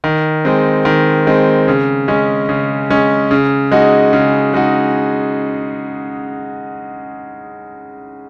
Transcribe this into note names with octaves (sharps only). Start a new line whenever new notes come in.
D#3
G#3 C4
D#3
G#3 C4
C#3
G#3 C#4
C#3
G#3 C#4
C#3
G#3 D#4 F#4
C#3
G#3 D#4 F#4